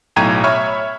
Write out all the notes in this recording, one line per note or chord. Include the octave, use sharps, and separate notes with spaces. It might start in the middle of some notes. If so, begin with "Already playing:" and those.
B1 A2 G5 A#5 G#6 D#7
C#5 E5 B5 C#6 F6